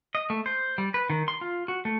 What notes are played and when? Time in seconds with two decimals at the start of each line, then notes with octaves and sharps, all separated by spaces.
0.15 D#5
0.30 A3
0.46 C5
0.78 G3
0.94 B4
1.10 D#3
1.28 C6
1.41 F4
1.68 F#4
1.85 A3